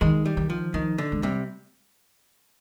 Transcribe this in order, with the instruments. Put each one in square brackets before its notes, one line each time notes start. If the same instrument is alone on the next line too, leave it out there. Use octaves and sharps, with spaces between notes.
[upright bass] D#3 [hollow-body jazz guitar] G#3
[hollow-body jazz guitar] G3
[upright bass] D#3
[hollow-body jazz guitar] F3
[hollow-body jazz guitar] D#3 [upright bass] F3
[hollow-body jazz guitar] D3
[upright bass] G#3
[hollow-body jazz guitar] C3 [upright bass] G3